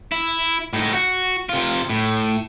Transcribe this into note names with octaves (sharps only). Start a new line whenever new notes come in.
E4
A2 D#4
F#4
C3 F4
A2